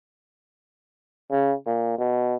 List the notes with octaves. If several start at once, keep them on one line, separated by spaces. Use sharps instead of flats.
C#3
A#2
B2